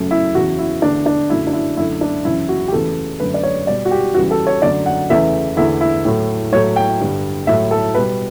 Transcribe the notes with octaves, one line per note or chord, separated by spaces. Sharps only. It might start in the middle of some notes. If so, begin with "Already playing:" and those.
Already playing: F#2 C#3 F#3 A3
E4
E2 C#3 E3 F#4
E4
E2 D3 A3 D4
D4
F#2 D3 F#3 A3 E4
D4
E4
F#2 D3 A3 E4
D4
F#2 C#3 E3 E4
F#4
G4
E2 C#3 E3 A3 A4
F#2 D3 A3 B4
D5
C#5
B2 G3 D5
F#4
G4
E2 C#3 E3 G3 F#4
A4
C#5
F#2 D3 F#3 A3 D5
F#5
E2 C#3 E3 A3 E5
E2 D3 A3 E4
E4
A2 F#3 A3
A2 F#3 A3 C#5
G5
G2 D3 G3
A2 F#3 A3 E5
A4
B2 G3 B4